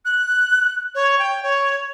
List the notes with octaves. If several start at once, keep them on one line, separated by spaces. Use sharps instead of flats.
F#6
C#5
G5
C#5